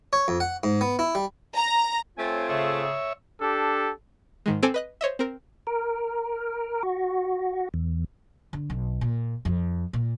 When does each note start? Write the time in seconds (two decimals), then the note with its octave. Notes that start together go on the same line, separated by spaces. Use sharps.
0.13 C#5
0.28 F2
0.40 F#5
0.63 G#2
0.81 B3
0.99 E4
1.15 G3
1.56 A#5
2.18 A3 C4 F4 C#5 G5 G#5
2.49 C#3 G#4 C#5 E5
3.41 D4 G4 A4
4.46 G#2 D#3 G#3
4.63 C4 A4 G#5 D6
4.74 B4 D#5 F#6
5.01 C5 C#5 D#5 E5
5.19 C4 A#4
5.67 A#4
6.83 F#4
7.74 E2
8.53 D3
8.70 B1
9.01 A#2
9.45 F2
9.93 A#2